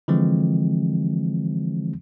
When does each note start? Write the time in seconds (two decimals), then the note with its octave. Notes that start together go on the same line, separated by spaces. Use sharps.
0.08 D3 E3 F3 G#3 C4